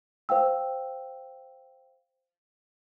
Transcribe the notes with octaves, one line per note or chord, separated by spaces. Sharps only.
C5 F5 G5 E6